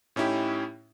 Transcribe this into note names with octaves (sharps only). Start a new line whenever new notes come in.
A2 C#4 D#4 E4 G4